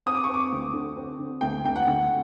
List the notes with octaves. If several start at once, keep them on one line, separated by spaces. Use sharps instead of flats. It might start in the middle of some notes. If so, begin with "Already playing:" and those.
C4 D#6
D6
C#6
C4
D6
D2
D3
C4
D3
D2 G5
D2 G5
F#5
D2